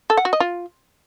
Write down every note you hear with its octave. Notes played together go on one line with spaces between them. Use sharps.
A4
F#5
F#4
D#5
F4